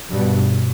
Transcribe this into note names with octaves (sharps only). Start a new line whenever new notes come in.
G2 B2